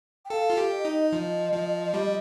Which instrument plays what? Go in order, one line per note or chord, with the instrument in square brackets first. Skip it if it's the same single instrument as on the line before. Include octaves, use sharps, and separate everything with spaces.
[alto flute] G5
[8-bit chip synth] A4 [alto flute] F5
[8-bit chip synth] F4
G4
[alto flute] D#5
[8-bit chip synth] D#4
[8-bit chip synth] F3 [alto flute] D#5
[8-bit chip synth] F3
G3